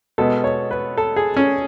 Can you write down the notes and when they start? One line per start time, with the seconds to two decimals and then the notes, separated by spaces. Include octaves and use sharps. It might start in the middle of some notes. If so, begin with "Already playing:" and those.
0.18 B2 G#3 B3 A4
0.44 C#5
0.71 B4
0.97 A4
1.16 G#4
1.37 C#4